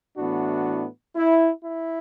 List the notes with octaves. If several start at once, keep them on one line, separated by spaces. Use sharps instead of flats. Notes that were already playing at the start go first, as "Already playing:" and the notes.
A2 E3 B3 D4 F#4
E4
E4